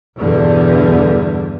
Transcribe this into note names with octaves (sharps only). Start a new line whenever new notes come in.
E2 G2 B2 D3 E3